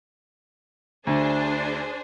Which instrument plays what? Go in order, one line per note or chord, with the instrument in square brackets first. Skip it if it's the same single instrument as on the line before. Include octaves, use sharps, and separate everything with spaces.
[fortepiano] D2 [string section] D4 G#4 C5